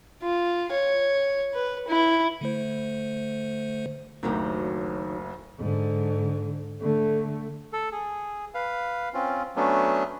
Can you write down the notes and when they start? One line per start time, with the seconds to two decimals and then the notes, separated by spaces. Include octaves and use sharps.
0.22 F4
0.72 C#5
1.53 B4
1.88 E4
2.41 D3 A3 C5
4.23 F#1 D2 D#3 F#3 G4
5.59 G#2 D3
6.81 D3 A3
7.73 A4
7.92 G#4
8.54 B4 F5
9.14 C4 C#4 F4
9.56 F#3 A3 B3 C#4 D4